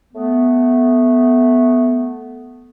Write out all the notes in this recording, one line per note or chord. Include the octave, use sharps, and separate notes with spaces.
A3 B3